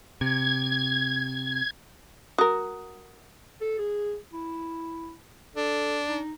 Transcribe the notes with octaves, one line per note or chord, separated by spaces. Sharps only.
C3 G#6
F#4 A#4 D#6
A4
G#4
E4
D4 A4
D#4